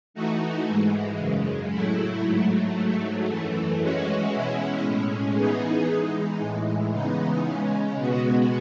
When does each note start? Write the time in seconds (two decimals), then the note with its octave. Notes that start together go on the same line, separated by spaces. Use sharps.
0.14 E3 A3 D#4 F#4
0.66 G#2 E3 G#3
1.18 F#2 C#3 G#3
1.71 A2 F#3 A3 E4
2.23 G#2 F#3 A3
2.75 G#2 F#3 A3
3.27 F#2 E3 A3
3.80 E3 G#3 C#4 F#4
4.31 B2 G#3 C#4 E4
4.83 A2 G#3 C#4
5.35 E3 B3 D#4 G#4
5.88 E3 G#3 D#4
6.40 A2 E3 G#3
6.92 C#3 E3 G#3 B3 D#4
7.44 C#3 G#3 C#4
7.97 B2 G#3 B3 F#4